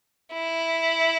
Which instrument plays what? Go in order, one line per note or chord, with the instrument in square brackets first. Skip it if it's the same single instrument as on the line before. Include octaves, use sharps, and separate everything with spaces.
[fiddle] E4